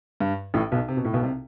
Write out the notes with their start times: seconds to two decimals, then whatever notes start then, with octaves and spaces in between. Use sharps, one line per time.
0.20 G2
0.54 A1 A2
0.71 B1 B2
0.88 C3
0.97 B2
1.05 A2
1.14 B1 B2
1.23 C2 C3